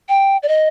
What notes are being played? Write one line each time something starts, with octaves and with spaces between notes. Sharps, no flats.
G5
D5
D#5